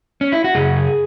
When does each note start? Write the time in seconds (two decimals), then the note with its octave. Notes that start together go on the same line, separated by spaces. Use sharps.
0.21 C#4
0.32 E4
0.44 F#4
0.55 F#2 C#3 G#4